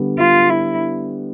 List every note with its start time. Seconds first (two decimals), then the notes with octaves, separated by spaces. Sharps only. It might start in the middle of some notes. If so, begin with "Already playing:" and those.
Already playing: D3 G3 B3
0.19 F4
0.50 E4